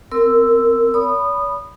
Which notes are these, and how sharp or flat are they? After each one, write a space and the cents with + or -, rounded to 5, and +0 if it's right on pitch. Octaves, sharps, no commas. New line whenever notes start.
C4 -25 A#4 -15 E6 +0
C#5 +45 B5 +0 D#6 -20